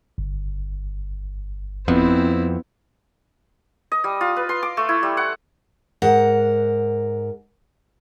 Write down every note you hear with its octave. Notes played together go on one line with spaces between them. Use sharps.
G1
F2 B3 C4 E4
D#5
G3
F4
B4
C6
D6
A3
E4
G3
F#5
G#2 A#4 F#5